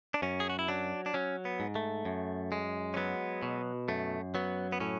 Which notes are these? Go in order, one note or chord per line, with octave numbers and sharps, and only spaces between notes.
D4
F#2 C#4
G#4
F#4
E4
F#3 D4
D4
F#3 C#4
B3
G#2
A3
F#2
G#3
C#4
F#3 B3
B2
F#2 A3
F#3 B3
B3
A2 C#4